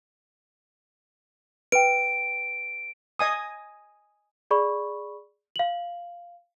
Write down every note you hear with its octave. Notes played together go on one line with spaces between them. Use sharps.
B4 G5 D7
D#5 G#5 D#6
G#4 D5 B5 C#6
F5 F#7